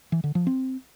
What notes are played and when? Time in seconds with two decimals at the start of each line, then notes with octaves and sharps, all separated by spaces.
0.12 E3
0.24 D3
0.35 F3
0.47 C4